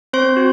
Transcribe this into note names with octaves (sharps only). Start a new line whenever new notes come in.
C4 C5 C6
F#4